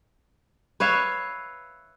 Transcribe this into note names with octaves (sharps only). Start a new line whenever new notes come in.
B4 C#5 E5 F5